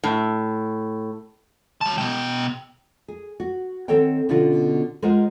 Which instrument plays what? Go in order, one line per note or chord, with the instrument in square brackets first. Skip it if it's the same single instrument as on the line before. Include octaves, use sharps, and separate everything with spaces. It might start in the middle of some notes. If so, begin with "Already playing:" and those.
[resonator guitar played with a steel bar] A2
[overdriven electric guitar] F#3 A5
B2 G5
[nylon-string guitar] G#4
F#4
D#3 C4 A4 C#5 F#5 G5
B2 D3 C#4 F4 F#4
G#3 F4 A#4 C5 D#5 F#5